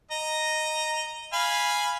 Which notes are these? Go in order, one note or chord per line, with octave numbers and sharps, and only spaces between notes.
D#5 A#5
F5 G#5 B5